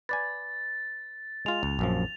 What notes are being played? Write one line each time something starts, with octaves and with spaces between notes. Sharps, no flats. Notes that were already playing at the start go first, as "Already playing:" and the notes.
B4 D5 G#5 A6
G#3 F4 F7
C#2
A#1 F#2 F3